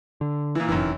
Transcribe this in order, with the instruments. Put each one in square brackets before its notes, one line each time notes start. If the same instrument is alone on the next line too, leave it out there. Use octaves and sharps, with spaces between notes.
[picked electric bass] D3
[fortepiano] A#2 E3
[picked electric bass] F1 [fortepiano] F#2 D#3 E3